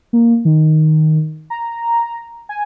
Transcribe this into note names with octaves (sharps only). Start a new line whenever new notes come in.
A#3
D#3
A#5
G#5